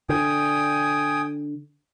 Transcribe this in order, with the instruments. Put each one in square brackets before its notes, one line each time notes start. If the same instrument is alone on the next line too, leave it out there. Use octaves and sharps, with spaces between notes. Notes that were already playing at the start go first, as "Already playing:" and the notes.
[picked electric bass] D3 [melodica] G5 G#5 D#6